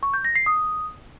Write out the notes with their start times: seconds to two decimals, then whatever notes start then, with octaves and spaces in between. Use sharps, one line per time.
0.03 C#6
0.14 G6
0.25 A#6
0.35 C7
0.46 D#6